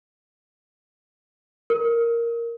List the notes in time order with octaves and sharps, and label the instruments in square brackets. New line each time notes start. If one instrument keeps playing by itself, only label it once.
[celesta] A#4